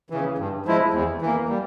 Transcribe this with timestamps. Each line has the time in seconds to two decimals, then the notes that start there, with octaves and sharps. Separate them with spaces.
0.10 C#3 E3
0.38 G2
0.66 F3 G#3 E4
0.94 E2
1.21 E3 A#3
1.49 G3